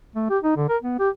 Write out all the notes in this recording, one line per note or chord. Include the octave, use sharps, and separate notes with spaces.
A3
G4
D#4
D3
A#4
B3
G4